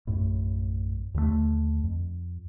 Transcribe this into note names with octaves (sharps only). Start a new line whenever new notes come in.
A#1 F#2 A2
D#2 D3 F#3 A3
F2